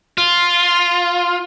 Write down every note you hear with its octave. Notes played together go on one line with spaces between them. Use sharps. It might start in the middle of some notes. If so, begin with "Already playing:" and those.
F4